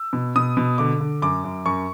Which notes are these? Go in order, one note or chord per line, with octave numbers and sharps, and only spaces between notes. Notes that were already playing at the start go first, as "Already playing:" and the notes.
Already playing: E6
B2
B2 D#6
B2
D3 D6
D3
F#2 D6
F#2
F#2 C#6